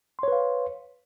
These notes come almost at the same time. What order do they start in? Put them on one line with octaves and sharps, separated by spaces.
C6 C#5 B4 F5